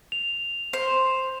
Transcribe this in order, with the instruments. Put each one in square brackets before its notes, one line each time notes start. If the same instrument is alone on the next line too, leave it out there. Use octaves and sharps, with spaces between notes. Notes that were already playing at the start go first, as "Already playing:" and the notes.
[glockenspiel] F7
[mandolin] C5